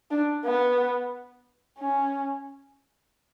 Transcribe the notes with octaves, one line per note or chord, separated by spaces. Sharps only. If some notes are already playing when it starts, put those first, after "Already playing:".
D4
B3
C#4